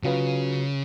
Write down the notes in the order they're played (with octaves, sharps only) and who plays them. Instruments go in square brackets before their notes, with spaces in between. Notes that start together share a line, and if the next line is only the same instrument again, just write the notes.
[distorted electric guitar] C#3 [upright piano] F#3 F4 B4